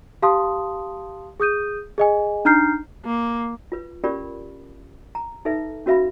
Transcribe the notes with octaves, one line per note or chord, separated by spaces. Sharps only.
G4 F5 A5 C6 D#6
G#4 D#6 G6 D#7
G#4 D#5 G#5
D4 D#4 A#5 F6 G6 C7
A#3
F4 B4
C#4 F4 G4 A#4 D5 B5
A#5
D#4 A4 B4 E5
C#4 F#4 B4 E5 F5 B5